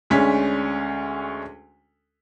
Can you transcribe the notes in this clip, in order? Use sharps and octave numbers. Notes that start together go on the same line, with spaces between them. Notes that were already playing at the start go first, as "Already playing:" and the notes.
D2 G#3 C#4 D4 B6